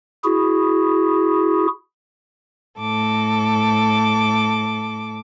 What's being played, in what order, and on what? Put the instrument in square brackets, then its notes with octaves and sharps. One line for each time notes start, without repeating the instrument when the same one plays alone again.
[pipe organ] E4 F#4 G#4
[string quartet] A2 A4 D6